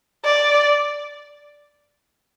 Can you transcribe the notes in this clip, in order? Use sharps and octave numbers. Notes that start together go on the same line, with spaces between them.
D5